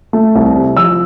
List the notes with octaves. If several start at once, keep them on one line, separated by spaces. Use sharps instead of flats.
A3
C2
C3
F3 E6